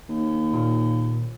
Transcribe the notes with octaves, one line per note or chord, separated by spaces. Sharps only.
D#2
A#2